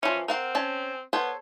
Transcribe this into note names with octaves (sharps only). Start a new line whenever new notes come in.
E3 F3 C#4
C4 A#4 F5 F#5
C#4 A5
B3 A4 C5 C#5